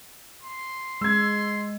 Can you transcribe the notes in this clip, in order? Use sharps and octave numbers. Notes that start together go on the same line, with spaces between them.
C6
G#3 E6 G#6